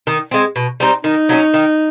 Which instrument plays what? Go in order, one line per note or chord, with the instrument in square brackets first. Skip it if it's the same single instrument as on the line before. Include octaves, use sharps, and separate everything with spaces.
[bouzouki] D#3
G#3 C4
B2
G3 C4 D#4
[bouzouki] D#3 [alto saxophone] D#4
[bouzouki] F#3 A3 C#4
D#3